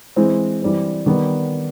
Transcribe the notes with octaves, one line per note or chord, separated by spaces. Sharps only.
E3 G#3 C4
E3 G3 C4
D#3 G3 B3